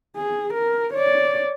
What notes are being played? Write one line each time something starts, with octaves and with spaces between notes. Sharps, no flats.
G#4
A#4
C#5 D5